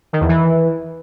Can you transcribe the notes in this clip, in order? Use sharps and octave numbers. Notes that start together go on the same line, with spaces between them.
D#3
E2
E3